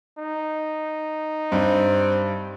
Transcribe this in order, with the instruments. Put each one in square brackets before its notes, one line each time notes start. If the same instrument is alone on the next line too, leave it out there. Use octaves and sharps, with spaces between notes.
[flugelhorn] D#4
[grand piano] G2 [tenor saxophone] C4